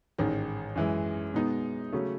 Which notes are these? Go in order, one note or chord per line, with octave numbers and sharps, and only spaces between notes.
A1 G#2 D#3
F#2 E3 G#3
B2 G#3 B3 D#4
C#3 F#3 A3 C#4